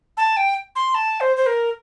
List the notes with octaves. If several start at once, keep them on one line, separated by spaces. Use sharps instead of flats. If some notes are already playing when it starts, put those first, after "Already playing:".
A5
G5
C6
A5
C5
C5
A#4